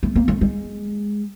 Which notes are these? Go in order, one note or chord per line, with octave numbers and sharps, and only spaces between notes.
A3
A#3
A3
G#3